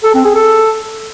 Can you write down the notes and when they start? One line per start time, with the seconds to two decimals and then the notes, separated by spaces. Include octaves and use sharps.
0.04 A4
0.14 C4
0.25 G#4
0.35 A4